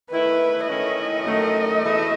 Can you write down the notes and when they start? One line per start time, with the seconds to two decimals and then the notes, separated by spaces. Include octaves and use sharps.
0.11 D#3 A3 E4 B4
0.67 D#3 A3 C#4 E4 D#5
1.24 F#2 D#3 A3
1.81 E2 B2 A3 E4